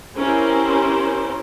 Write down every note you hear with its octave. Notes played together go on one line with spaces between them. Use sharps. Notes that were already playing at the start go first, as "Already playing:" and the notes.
C4 C#4 E4 G4 A#4 C5